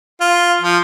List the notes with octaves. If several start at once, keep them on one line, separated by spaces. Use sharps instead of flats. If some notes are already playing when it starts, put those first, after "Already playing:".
F4
F3